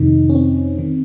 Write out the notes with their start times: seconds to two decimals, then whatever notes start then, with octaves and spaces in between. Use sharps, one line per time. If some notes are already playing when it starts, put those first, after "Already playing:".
Already playing: F2 C3 D#3 D#4
0.30 C#4
0.35 C4
0.79 D#3